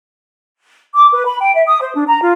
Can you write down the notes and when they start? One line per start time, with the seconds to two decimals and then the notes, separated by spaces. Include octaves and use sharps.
0.94 D6
1.12 B4
1.25 B5
1.40 G5
1.54 E5
1.66 D#6
1.81 C5
1.95 D4
2.08 A#5
2.21 F4